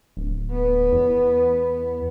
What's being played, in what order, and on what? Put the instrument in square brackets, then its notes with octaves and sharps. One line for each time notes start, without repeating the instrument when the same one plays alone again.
[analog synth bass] D1
[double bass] B3
[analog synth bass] E2